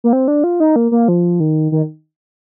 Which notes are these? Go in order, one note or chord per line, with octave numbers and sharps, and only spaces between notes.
A#3
C4
D4
F4
D#4
A#3
A#3
F3
D#3
D#3